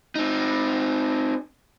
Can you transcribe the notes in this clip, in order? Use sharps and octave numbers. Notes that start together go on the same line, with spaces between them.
C4 D#4